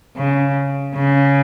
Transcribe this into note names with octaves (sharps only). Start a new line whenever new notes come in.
C#3
C#3